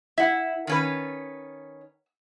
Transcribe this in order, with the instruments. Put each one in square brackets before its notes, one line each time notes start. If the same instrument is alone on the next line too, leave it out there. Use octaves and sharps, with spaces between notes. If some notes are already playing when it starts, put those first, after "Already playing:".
[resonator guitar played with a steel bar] E4 [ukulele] E5 F#5
[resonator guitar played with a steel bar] D#3 C#4 B4